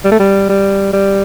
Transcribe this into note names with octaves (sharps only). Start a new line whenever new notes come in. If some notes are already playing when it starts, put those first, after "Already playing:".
G3
A3
G3
G3
G3